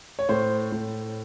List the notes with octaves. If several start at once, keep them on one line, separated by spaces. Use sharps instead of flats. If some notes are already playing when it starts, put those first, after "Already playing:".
C#5
A2 C5
A2